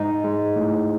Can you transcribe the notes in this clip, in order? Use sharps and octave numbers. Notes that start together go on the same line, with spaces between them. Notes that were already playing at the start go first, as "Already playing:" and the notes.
Already playing: G#2 D#4
G#3
A2